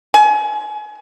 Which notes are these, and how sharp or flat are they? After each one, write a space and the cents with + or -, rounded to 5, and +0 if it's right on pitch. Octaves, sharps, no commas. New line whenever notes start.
G#5 +30